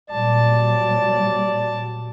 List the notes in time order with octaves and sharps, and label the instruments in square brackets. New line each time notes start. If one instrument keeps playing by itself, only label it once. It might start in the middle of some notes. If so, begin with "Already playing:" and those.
[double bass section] A#2 F#3 G3 [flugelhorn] D5 [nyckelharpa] A5